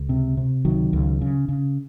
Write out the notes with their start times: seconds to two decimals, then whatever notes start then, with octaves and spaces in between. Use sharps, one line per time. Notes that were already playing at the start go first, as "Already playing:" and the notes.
Already playing: C#2
0.09 C3
0.37 C3
0.65 C#2 D#3 F#3
0.93 C#2
1.21 C#3
1.49 C#3